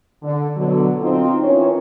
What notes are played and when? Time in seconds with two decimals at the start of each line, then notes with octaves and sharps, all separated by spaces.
0.23 D3
0.57 B2 D3 F#3
1.02 C4 D#4 F4
1.44 E3 C#4 A#4 C#5